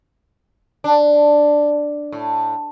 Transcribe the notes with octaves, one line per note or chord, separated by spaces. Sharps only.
D4
A2